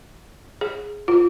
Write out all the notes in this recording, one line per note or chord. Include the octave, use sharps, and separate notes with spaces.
G#4
F4